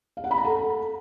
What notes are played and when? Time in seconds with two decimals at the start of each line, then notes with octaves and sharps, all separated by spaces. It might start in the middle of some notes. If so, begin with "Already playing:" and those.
0.17 F5
0.24 F#5
0.31 B5
0.38 A#5
0.45 A4